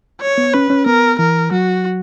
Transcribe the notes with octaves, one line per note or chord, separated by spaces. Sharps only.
C#5
B3
C#4 B4
C#4
B3 A#4
E3 A#4
F#3 F#4